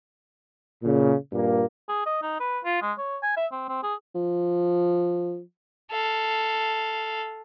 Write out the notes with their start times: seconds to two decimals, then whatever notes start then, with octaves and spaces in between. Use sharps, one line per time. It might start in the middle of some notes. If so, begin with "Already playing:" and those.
0.83 A#2 C#3
1.33 G2 A#2 A#3
1.89 G#4
2.06 D#5
2.22 D#4
2.40 B4
2.65 F4
2.82 G#3
2.98 C#5
3.23 G#5
3.37 E5
3.52 C4
3.68 C4
3.83 G#4
4.15 F3
5.92 A4 F5